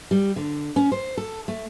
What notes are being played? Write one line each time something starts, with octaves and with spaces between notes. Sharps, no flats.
G3
D3
C#4
C5
A4
A3